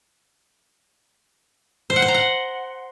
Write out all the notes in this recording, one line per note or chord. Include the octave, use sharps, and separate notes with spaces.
C5
F#5
C5
A#5
F#5